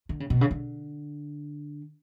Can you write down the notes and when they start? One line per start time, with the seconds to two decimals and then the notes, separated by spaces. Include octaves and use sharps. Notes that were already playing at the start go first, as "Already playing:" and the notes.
0.09 D3
0.20 C#3
0.30 B2
0.41 C#3
0.51 D3